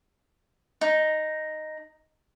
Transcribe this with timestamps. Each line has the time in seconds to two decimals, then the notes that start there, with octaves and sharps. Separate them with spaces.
0.81 D#4